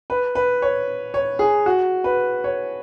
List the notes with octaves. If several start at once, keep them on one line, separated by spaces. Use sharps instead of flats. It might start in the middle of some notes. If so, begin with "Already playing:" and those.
B4
B4
C#5
C#5
G#4
F#4
B4
C#5